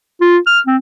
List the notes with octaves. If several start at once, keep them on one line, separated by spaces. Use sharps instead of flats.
F4
F6
C4